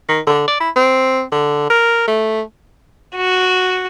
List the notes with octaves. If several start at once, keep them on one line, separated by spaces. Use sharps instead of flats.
D#3
D3
D5
E4
C4
D3
A#4
A3
F#4